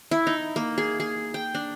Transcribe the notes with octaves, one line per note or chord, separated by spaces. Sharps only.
E4
D#4
A#3
G#4
G#4
G5
D4